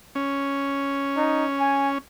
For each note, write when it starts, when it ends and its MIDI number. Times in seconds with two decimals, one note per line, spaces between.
0.15 1.98 61
1.17 1.45 63
1.60 1.89 80